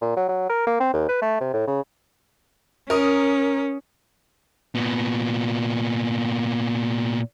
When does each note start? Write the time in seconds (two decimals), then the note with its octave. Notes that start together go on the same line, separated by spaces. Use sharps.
0.02 A#2
0.17 F#3
0.29 F#3
0.49 A#4
0.67 A#3
0.80 C4
0.93 D#2
1.09 B4
1.22 A3
1.41 C3
1.53 A2
1.67 C#3
2.90 C#4 A#4 D#6
4.75 A#2 B3